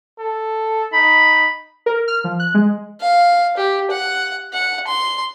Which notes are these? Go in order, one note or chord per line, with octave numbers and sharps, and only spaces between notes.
A4
D#4 B5
A#4
F6
F3
F#6
G#3
F5
G4
F#5
F#5
C6